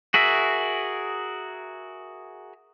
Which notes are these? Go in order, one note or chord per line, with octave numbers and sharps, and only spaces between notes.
F#4 G#4 A#4 E5